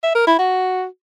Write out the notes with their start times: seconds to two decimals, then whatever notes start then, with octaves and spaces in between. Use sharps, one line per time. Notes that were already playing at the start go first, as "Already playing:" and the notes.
0.03 E5
0.15 A#4
0.27 E4
0.39 F#4